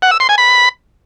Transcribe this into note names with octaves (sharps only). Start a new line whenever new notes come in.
F#5
E6
C6
G#5
B5